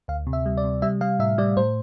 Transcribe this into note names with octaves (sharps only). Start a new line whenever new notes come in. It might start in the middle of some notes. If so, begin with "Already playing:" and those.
D2 F5
C3
E5
G3
D5
C3
G3 E5
G3 F5
A2 E5
G3 D5
A2 C5